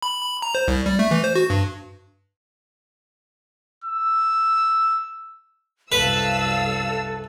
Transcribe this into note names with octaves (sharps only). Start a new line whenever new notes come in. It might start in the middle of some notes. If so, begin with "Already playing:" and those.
B5
B5
A#5
C5
C2
G3
A3
E3
C5
F#4
G2
E6
C2 F#2 A4 B4 F5 E6